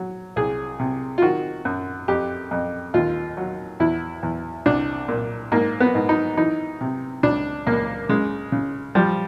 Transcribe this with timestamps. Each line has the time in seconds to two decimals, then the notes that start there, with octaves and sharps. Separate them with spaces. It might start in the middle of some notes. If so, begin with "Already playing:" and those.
Already playing: F#3
0.36 C2 G#4
0.79 C3
1.18 F4
1.22 D#3 F#4
1.65 F#2
2.08 F2 G4
2.51 F2
2.94 D#2 F4
3.37 F#3
3.80 E2 E4
4.23 E2
4.66 C2 D4
5.08 A#2
5.52 G#2 A#3
5.80 B3
5.95 G#2
6.09 D#4
6.37 E3 D#4
6.81 C3
7.23 C#2 D4
7.67 C#2 A#3
8.09 C#3 G#3
8.52 C#3
8.95 F3 G3